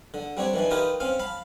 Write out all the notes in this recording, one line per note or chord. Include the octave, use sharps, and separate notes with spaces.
D3
G3 C4 D4 C#5
D#3 E3 D4
D#4 F4 G4 A#4 B4
C4 C#4 F5
F5 A5 B5